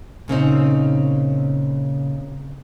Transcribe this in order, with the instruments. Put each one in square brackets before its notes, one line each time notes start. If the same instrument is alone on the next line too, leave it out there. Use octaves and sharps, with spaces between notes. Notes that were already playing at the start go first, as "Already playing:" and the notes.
[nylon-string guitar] A#2 C#3 C4 D#4